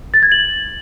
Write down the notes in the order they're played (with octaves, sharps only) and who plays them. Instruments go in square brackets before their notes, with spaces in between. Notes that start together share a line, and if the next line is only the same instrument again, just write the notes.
[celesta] A6
G#6
F#7